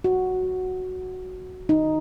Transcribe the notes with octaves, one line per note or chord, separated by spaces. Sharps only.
F#4
D#4